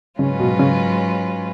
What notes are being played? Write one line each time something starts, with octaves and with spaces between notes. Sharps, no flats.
G#2 C#3 F#3 C#4 F4 B4
B2
C#3